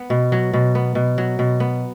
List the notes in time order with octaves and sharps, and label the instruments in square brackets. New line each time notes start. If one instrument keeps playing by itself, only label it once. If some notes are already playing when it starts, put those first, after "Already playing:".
Already playing: [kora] B3
B2
F#3
B2
B3
B2
F#3
B2
B3